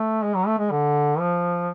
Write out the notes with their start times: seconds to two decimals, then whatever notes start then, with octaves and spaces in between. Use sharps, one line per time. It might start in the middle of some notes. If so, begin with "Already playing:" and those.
Already playing: A3
0.23 G#3
0.35 F#3
0.47 A3
0.59 G#3
0.71 D3
1.19 F3